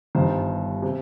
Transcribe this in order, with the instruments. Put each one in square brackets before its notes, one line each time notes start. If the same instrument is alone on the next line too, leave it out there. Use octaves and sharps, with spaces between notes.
[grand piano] G1 G2 D#3 C5
C3